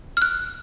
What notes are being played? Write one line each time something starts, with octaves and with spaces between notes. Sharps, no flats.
F6
F#6